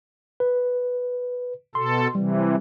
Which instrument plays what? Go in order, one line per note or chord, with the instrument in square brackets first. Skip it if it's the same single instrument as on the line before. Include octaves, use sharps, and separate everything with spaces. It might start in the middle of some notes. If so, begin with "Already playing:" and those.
[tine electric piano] B4
[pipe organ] B2 A4 [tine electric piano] C6
[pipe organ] C3 E3 [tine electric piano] G3